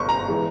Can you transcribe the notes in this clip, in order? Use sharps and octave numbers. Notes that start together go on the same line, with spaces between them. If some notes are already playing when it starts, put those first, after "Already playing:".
Already playing: G1 G2 C#6
A#5
E3 G#3